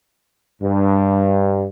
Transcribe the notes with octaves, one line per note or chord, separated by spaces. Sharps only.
G2